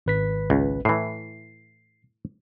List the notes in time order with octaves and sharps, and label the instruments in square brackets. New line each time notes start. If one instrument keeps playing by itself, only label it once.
[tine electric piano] G#1 B4 B6
[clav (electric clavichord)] C#2
[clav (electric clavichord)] A2 E3 [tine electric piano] C7